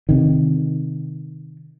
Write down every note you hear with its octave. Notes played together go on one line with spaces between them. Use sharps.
C3 D#3